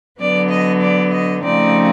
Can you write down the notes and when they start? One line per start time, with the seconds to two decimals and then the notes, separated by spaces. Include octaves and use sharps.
0.18 D3 F#3 B3 D5
0.49 D#5
0.80 D5
1.11 D#5
1.41 C#3 F3 A3 C4 D#4 D5